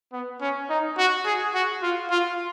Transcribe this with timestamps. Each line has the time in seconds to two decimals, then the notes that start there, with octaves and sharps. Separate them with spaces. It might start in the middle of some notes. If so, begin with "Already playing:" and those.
0.13 B3
0.41 C#4
0.69 D#4
0.98 F#4
1.25 G#4
1.54 F#4
1.82 F4
2.10 F4